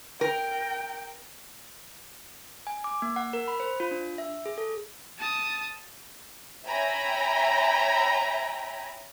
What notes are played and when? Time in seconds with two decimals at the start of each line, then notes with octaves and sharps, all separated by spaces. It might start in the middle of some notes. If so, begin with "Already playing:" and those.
0.21 A#4 G5
2.67 G#5
2.84 D6
3.02 A#3
3.16 F#5
3.33 A#4
3.48 B5
3.60 C5
3.80 F4
3.91 D4
4.18 E5
4.46 G#4
4.58 A4
5.19 A5 D#6
6.66 C#5 E5 G5 G#5 A#5 B5